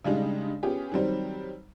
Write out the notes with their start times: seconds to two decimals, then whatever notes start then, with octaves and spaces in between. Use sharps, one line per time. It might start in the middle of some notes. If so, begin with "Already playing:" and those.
0.04 C#3 G3 G#3 D4 D#4
0.63 B3 C#4 F4 G4 G#4
0.92 D#3 F#3 G3 C4